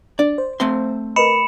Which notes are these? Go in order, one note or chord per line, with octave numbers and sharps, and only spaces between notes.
D4 D5
C5
A3 C4 C6
A#4 B4 D#5 B5 C#7 E7